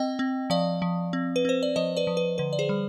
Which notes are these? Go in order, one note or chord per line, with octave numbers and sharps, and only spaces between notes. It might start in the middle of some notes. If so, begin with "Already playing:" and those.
Already playing: C4 D#5 G5
C4
F3 D5 F5
F3
C4
B4
C4 C5
D5
F3 C5 D#5
B4 D5
F3
B4
D3 B4
D5
G#4 C5
G3